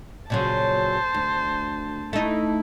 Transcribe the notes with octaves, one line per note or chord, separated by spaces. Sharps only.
A#2 C#3 F#3 C5 A5
D2
A3 D#4 E4